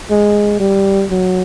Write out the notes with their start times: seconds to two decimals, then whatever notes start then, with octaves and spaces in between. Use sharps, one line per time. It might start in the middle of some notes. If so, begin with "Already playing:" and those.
0.11 G#3
0.60 G3
1.11 F#3